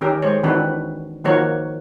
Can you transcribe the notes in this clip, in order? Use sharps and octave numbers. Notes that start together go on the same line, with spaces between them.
D#3 C#4 G4 A#4
G#3 C5 C#5
D#3 E3 C4 D4 F#4 B4
D#3 F3 A#3 F#4 A#4 C#5